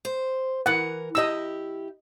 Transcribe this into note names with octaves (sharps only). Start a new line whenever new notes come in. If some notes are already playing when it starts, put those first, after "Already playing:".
C5
E3 A#4 F#5
E4 G4 D#5 E5 E6